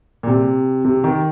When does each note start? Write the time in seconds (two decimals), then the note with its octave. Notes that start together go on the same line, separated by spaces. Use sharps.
0.23 A#2
0.27 C3
0.85 C3
1.04 D#3